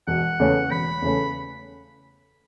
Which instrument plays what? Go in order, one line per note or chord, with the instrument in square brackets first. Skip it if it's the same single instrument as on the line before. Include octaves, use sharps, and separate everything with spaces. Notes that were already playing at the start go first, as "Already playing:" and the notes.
[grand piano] E1 [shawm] F#5
[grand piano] E2 C#3 A3 C#4
[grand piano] E1 [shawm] B5
[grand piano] E2 C#3 A3 C#4